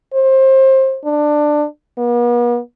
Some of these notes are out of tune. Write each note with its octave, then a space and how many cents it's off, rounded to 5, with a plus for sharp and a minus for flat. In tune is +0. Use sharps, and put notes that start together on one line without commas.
C5 +25
D4 +15
B3 -45